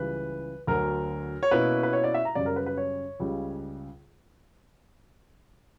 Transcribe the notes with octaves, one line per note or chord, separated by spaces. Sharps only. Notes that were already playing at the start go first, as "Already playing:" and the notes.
Already playing: C#2 C#3 E3 G3 B4
D2 D3 F#3 A#4
C#5
B2 A#3 C#4 E4 B4
B4
C#5
D5
E5
A#5
F#2 C#3 G3 C#4 D5
A#4
B4
B4
C#5
C#2 C#3 G3